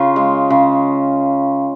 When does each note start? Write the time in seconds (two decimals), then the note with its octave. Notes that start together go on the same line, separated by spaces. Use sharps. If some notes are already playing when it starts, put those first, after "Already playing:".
Already playing: C#3 F4
0.16 G#3
0.50 C#3